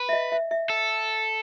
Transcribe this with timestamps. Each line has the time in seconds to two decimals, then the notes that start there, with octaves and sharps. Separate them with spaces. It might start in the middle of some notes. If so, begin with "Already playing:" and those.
Already playing: B4
0.09 E5
0.13 D#5
0.32 E5
0.51 E5
0.70 A4